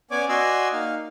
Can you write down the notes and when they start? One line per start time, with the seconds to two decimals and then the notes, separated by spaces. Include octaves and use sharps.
0.11 B3 C#4 C#5 D5 G#5 D6
0.29 F#4 D5 D#5 G#5 C6 E6
0.73 A#3 D#4 F5